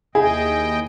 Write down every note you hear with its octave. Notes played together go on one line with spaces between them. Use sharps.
D#2 E4 G#4 D#5 G5